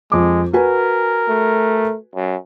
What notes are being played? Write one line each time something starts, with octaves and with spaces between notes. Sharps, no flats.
F2 G#3 D6
F#4 A#4 B4 G#5
A3
F#2